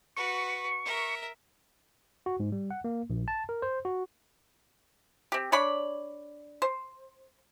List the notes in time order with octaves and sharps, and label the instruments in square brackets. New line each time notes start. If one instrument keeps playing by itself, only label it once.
[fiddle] F#4 B4 [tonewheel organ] C#6
[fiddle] A#4 E5
[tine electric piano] F#4
G#2
G3
F#5
A#3
A#1
A5
A#4
C5
F#4
[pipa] C4 G4
D4 C#5 D5 B5
C5